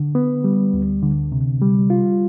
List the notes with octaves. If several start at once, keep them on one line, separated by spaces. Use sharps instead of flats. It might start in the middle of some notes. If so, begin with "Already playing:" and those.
Already playing: D3
B3
G3
D2
D3
C3
G3
F4